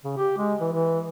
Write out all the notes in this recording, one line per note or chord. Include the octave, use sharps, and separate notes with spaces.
C#3
G4
G#3
E3
E3